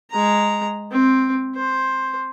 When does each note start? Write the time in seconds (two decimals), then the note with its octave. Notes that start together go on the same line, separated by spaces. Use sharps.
0.11 G#3 A#5
0.92 C4
1.56 C5